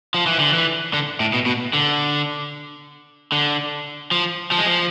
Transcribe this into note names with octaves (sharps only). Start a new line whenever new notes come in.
F3
E3
D3
E3
D3
A2
B2
B2
D3
D3
F3
F3
G#3
F3